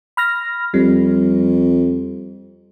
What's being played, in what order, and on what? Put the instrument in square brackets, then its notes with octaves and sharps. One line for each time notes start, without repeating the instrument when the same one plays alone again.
[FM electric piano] B5 F6 A#6
[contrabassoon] F2 [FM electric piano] G3